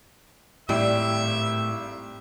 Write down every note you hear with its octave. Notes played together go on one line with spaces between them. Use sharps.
G#1 A2 G3 E4 E5 G5